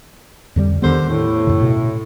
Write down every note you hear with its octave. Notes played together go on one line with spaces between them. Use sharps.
F2 D3 G3
E2 D3 D#3 G3 B3 C5
A2
F#2 C#3
B2